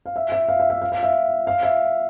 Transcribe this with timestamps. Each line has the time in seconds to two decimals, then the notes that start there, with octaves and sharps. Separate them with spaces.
0.06 F5
0.16 E5
0.32 E5
0.49 F5
0.60 E5
0.70 E5
0.82 F5
0.92 F5
1.03 E5
1.47 F5
1.63 E5